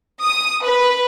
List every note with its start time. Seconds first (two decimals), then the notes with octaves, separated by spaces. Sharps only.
0.23 D#6
0.63 B4